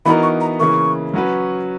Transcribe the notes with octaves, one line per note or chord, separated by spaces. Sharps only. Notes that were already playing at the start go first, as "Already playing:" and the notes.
E3 B3 D#4 F#4 A#4 B5
C#6
A#5
C#3 E3 A#3 C#6
F#3 C#4 F#4 B4